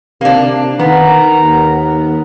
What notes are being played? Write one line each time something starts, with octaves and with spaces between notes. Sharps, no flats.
C3 A#3 D4
D#3 B3 A#4 A#5
D#2